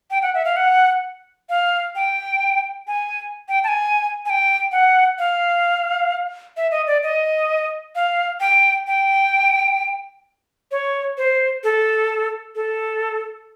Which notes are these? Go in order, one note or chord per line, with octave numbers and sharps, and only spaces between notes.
G5
F#5
E5
F5
F#5
F5
G5
G#5
G5
A5
G#5
G#5
G5
F#5
F5
E5
D#5
D5
D#5
F5
G5
G5
C#5
C5
A4
A4